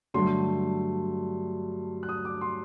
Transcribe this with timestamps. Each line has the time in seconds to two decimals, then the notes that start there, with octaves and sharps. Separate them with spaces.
0.14 G2 D3 F#3 A3 C6
2.03 F#6
2.09 D#6
2.25 D6
2.41 C6